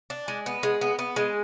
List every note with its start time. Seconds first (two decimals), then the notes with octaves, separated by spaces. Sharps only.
0.10 D4
0.28 G#3
0.46 B3
0.63 G#3
0.81 B3
0.99 B3
1.16 G#3